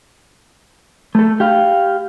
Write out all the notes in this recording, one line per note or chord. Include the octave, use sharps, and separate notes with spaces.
A3 A4
G4 F5